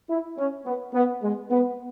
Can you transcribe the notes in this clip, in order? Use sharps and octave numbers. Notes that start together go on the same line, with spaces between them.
E4
C#4
B3
B3
G#3
B3